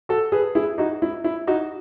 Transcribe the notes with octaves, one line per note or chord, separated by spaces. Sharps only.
F#4 A4
G#4 B4
E4 G#4
D#4 F#4
E4
E4
D#4 F#4